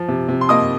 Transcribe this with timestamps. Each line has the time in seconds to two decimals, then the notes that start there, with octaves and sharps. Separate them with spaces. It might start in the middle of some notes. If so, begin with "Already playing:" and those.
Already playing: F3
0.08 C3
0.28 C3
0.41 C6
0.49 A#3 D#5 D#6